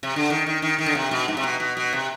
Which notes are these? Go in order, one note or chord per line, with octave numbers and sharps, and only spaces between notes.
C3
D3
D#3
D#3
D#3
D#3
D3
C3
B2
G#2
C3
B2
B2
B2
C3